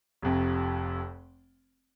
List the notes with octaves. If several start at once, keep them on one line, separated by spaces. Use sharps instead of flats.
F1 F2 C3